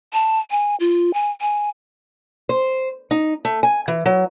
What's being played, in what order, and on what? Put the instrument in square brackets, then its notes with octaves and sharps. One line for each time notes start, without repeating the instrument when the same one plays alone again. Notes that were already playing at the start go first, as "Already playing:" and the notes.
[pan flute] A5
G#5
F4
G#5
G#5
[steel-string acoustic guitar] C5
D#4
A3
G#5
E3
F#3